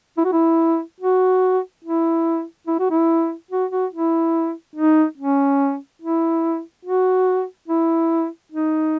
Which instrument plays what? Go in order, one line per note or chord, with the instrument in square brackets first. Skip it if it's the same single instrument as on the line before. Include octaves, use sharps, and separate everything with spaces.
[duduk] E4
F#4
E4
F#4
E4
E4
F#4
E4
F#4
F#4
E4
D#4
C#4
E4
F#4
E4
D#4